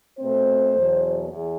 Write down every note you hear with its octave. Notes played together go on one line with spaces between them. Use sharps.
B2 A3 C4 C5
E2 B2 F#3
E2